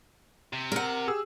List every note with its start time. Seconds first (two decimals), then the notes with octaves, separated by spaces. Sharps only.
0.53 C3
0.72 A#4 F#5
1.08 G4 G#4 E6